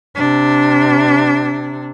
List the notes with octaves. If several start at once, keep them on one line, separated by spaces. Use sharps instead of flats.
C3 D4